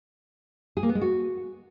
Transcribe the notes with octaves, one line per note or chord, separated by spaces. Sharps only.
G#4
A#3
B3
G#3
F#4